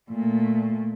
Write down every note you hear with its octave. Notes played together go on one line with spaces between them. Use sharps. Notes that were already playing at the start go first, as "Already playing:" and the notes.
A#2 A3